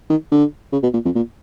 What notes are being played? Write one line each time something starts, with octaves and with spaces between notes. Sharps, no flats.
D#3
D3
C#3
B2
A#2
F2
A#2